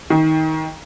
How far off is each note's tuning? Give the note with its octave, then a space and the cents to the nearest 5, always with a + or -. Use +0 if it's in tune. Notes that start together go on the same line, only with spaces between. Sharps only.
D#3 +20